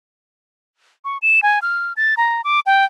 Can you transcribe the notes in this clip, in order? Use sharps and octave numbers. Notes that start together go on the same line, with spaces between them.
C#6
E7
G#5
F6
A6
A#5
D6
G5